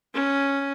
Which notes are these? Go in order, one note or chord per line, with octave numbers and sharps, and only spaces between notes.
C#4